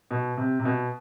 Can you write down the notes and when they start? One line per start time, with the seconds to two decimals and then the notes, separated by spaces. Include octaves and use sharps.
0.11 B2
0.37 C3
0.59 C3
0.65 B2